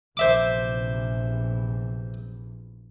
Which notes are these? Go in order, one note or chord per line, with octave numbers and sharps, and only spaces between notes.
A#1 E2 C3 C5 E5 D6